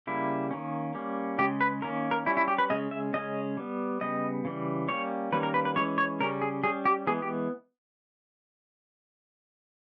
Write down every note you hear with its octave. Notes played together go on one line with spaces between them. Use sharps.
C#3 G3 A#3 E4
D#3 A#3 C#4
G3 A#3 C#4
C#3 G#3 C#4 G4
B4
D#3 A#3 C#4 A#4
A#4
G3 C#4 E4
E4
G4
B4
C#3 G#3 C#4 D#5
E5
C#3 G#3 C#4 D#5
G3 B3
C#3 G3 B3 D#5
C#3 E3 G3
G3 A#3 C#4 C#5
D#3 G3 A#3 C#4 B4
A#4
B4
B4
E3 G#3 C#4 C#5
C#5
C#3 G3 C#4 A#4
G#4
G3 C#4 G#4
G4
E3 G#3 B3 G#4
G4